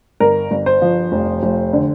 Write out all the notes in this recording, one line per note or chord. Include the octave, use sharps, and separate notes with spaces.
G1 A#4
G1
C5
F3
F1
F1
D3